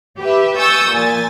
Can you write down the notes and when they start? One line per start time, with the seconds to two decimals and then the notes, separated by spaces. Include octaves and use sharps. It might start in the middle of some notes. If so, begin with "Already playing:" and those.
0.20 G4 B4 E5
0.58 G#5 C#6 D#6 E6 G6 A6
0.91 A#2 G#5 A6